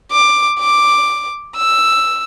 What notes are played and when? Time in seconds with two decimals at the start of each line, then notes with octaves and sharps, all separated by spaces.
0.12 D6
0.59 D6
1.56 E6